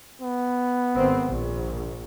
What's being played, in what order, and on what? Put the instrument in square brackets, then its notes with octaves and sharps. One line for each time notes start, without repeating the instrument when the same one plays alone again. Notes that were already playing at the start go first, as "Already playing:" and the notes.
[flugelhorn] B3
[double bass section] G#1 C4
A#1